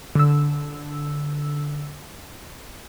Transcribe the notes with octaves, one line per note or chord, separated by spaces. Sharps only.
D3 E6